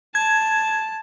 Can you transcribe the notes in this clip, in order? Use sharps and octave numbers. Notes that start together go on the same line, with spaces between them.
A5 G#6